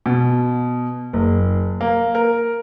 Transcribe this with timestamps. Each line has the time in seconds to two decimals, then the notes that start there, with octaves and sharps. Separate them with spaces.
0.06 B2
1.13 F#1
1.81 A#3
2.15 A#4